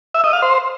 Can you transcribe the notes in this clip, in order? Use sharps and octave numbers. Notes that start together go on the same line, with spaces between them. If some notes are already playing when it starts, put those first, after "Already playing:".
E5
D#5
F5
C5